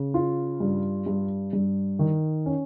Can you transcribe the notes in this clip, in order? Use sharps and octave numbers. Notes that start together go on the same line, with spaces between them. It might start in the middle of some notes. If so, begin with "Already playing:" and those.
Already playing: C#3
F4
G2
G2
G2
D#3
C#4